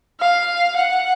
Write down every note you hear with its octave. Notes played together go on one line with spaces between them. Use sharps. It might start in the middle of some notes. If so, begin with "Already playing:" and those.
F5
F#5